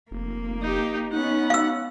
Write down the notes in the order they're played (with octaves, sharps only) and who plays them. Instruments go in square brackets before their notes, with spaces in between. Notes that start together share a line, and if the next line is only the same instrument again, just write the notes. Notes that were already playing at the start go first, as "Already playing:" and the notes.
[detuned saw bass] F1 [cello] A#3
[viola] D#4 G4
[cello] B3 C#4 [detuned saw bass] D#4 [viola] F#5
[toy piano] F5 E6